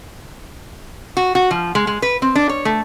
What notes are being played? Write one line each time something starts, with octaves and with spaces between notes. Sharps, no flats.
F#4
F#4
F3
G#3
G#3
B4
C4
D4
C#5
A3